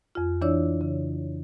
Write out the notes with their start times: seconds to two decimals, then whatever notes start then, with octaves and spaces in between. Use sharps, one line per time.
0.15 F2 F4
0.41 E3 D4 E4 C#5 D5 E6
0.81 C#3